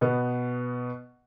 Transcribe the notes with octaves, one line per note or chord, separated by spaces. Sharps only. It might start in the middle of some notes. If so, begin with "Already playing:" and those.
B2 B3